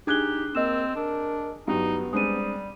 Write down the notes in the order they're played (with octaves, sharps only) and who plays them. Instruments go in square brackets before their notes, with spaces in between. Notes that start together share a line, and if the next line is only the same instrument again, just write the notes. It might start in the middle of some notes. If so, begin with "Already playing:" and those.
[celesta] D4 F#6 G7 [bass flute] D#4 [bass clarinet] G4 [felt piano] G#4 G#6
[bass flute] A#3 [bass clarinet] C4 [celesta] D#5 E6 E7
[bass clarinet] D4 [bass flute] A#4
[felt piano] G2 F#3 G3 [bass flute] B3 [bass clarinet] D#4
[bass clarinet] G3 [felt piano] G#3 C4 D4 [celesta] D#6 D#7